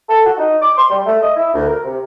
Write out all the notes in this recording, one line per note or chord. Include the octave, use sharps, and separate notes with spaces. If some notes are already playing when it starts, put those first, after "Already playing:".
A4
F#4
D#4
D6
C6
G3
A3
D#5
E4
D2
A#4
C3